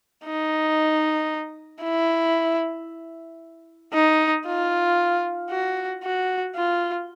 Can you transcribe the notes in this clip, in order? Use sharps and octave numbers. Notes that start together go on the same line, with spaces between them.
D#4
E4
D#4
F4
F#4
F#4
F4